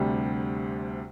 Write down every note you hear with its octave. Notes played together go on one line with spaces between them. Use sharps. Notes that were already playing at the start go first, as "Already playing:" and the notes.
Already playing: D2 C3 G3 D4